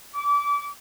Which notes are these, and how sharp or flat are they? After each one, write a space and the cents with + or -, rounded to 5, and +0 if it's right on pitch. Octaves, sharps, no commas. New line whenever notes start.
D6 -30